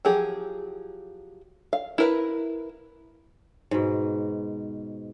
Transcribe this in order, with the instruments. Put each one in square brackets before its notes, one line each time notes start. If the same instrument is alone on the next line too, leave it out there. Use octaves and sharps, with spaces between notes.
[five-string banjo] F3 F#3 G4 G#4
F5
E4 A#4 B4
[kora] G#2 B2